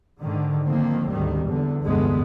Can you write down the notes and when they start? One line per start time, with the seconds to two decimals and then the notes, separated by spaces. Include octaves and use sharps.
0.21 G#2 D3 D#3
0.67 D3 D#3 F3 A#3 C4
1.09 G#1 D2 D#3 G3
1.45 E2 D3
1.83 F1 D2 G2 D3 G#3 B3